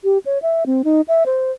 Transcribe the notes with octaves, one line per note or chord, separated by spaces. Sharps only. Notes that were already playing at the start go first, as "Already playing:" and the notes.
G4
C#5
E5
C4
D#4
E5
C5